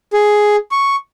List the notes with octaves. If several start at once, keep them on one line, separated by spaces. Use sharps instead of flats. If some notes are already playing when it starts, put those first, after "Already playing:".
G#4
C#6